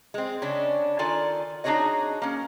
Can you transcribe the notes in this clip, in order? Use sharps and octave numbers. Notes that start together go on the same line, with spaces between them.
G#3 C4
C#3 C#4 D4
D#3 F4 A4 D5 G#5
D4 D#4 F#4 G#4 C#5 D#5
A#3 C#4